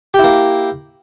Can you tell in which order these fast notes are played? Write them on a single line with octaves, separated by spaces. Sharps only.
G4 E4 A#3